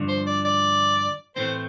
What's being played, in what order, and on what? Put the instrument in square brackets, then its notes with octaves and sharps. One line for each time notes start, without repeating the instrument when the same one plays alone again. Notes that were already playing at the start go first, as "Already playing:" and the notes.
Already playing: [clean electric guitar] G2 D3 F3
[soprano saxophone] C5
D5
D5
[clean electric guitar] A2 E3 A3 C4 [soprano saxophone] C5